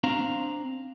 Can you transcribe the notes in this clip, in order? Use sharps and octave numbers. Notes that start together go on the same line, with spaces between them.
C4 D4 F5 A#5